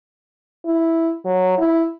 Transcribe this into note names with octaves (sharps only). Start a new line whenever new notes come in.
E4
F#3
E4